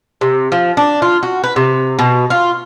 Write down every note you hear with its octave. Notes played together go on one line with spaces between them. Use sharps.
C3
F3
D4
F4
F#4
B4
C3
B2
F4